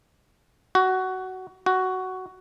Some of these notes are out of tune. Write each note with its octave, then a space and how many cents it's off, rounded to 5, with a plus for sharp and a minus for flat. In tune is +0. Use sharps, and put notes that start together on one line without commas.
F#4 +15
F#4 +10